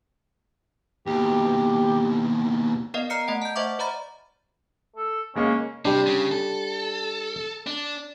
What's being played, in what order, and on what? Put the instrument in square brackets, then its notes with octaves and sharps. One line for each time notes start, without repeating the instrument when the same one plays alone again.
[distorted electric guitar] D#2 B2 [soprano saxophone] G4
[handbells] B3 A#4 D5 D#5 F5
D5 A#5 F6 C7 C#7
A3 D#5 F#5 D7
A5 G6
C5 D#5 E5 F#5 C#6 D6
C5 D5 A#5 B5 A6
[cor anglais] A4
[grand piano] C#3 G#3 A#3 [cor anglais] C#4
[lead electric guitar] C3 [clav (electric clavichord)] G3 D4
[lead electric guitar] C#3
A4
D4